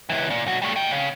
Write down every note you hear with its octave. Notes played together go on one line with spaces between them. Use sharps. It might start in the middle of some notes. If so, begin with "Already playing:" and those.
C#2 E3
A#2
B1 F#4
G3 A3
D#5 G5
C#3